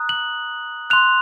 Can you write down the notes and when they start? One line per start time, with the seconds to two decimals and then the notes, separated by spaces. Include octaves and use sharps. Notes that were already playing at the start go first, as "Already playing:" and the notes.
Already playing: A#5 D#6 F#6
0.09 F#7
0.90 C6 F#6 F7